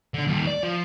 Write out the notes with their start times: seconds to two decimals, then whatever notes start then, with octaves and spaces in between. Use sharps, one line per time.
0.14 D3 D4
0.27 D#2 G3
0.47 D5
0.63 F3